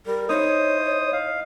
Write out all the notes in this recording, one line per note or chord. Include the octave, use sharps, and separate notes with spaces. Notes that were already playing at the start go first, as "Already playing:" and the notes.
G3 A#4
D#4 E4 C5 C#5 D#6
F5